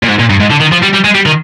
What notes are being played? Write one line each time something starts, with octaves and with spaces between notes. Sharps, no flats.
A#2
G#2
A#2
G2
G#2
D3
D#3
F3
G3
G3
G#3
G3
D#3